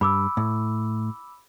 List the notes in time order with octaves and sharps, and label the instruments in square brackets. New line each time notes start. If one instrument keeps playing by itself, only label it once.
[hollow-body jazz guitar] G2 [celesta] B5 D6 E6
[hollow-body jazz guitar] A2